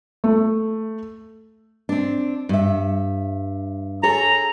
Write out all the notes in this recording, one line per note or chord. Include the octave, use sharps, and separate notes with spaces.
A3
C4 D4
G2 E5
G#4 A4 C#5 A#5